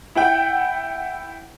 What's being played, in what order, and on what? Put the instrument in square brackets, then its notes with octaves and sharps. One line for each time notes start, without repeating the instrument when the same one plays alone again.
[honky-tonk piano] E4 F#5 G5